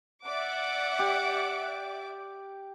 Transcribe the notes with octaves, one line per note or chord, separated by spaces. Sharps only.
D5 E5 F#5 D6
G4